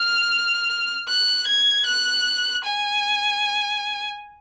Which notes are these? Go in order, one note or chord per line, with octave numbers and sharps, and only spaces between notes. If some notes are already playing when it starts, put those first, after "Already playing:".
Already playing: F6
F#6
G#6
F#6
G#5